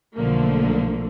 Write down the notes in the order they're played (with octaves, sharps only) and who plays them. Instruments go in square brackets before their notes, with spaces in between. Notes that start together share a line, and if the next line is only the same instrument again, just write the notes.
[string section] B1 D3 F3 A3 A#3